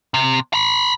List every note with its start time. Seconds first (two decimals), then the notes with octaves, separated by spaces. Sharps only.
0.14 C3
0.54 A#5 B5